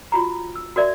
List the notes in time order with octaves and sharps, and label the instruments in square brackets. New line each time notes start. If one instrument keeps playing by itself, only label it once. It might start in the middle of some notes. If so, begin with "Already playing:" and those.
[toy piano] F4 F#4 A#5
E6
F#4 A#4 D5 E5